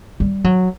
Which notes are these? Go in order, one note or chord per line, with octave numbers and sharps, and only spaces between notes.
G3
F#3